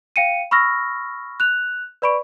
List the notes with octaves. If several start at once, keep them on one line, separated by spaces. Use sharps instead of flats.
F5 G5 C#7 D#7
B5 C#6 E6 F6 A#6
F#6 F7
B4 D5 B5 C#6 D7